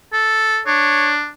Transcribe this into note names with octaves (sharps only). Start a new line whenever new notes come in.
A4
D4 C#5